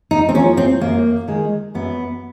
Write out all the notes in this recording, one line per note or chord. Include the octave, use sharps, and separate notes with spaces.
D#4
C4
F3 A#3 C#4
C4
F#2 A#3
D#3 G#3
F#2 B3